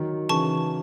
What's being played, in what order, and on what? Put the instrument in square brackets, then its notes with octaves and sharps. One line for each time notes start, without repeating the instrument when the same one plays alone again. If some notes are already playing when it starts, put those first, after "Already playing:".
Already playing: [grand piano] D#3 F#3
[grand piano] C#3 E3 [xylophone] A5 C#6